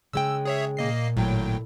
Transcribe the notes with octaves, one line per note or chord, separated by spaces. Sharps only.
C#3 G#3 G5 E6
G#4 C#5 E5
A#2 A#3 D#5 C7
G#1 A2 F#3 G5